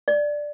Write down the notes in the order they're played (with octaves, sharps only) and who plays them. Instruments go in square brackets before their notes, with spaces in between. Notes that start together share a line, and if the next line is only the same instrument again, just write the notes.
[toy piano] D5